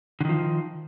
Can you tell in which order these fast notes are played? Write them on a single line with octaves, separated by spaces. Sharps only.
D3 D#3 F3